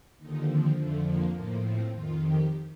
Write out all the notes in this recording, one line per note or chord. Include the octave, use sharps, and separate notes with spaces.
D#2 D3 F3 D#4
C4
F2 D3 F3 A3
A#3
A2 F3 A#3
C4
F2 D#3 F4
G4